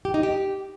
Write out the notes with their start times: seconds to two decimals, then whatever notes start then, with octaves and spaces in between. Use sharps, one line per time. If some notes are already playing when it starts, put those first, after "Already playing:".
0.05 G4
0.14 D#4
0.23 G4